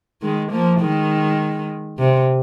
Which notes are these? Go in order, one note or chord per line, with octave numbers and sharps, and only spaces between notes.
D#3 G#3
F3 A#3
D#3 G#3
C3